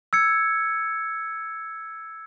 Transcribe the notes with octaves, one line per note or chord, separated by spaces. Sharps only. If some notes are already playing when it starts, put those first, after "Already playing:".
E6 G#6 C#7